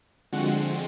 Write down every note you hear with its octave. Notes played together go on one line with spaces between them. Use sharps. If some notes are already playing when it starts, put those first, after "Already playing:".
D3 F3 G#3 C4 F#4 F#5